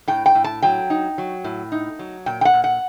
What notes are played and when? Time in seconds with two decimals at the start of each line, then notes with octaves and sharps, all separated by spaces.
0.08 A2 G5
0.26 G5
0.35 A2
0.44 A5
0.62 F#3 G5
0.90 D#4
1.18 F#3
1.44 A2
1.72 D#4
1.99 F#3
2.26 A#2 G5
2.41 G5
2.45 F#5
2.53 A#2
2.64 F#5